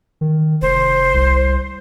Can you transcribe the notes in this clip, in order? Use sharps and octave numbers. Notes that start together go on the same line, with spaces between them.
D#3
F1 C5
C2